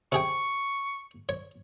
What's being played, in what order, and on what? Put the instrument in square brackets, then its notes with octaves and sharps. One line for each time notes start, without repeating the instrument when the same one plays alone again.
[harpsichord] C3 G#4 G5 [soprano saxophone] C#6
[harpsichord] C#5